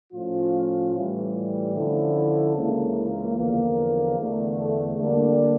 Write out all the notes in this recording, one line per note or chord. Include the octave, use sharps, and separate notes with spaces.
A2 F3 C#4 F4
A2 E3 G3
D3 F3 C#4 E4 A4
C#2 C#3 E3 A#3
E2 D3 F3 A#3
E2 D3 A3
D3 G3 A#3 D4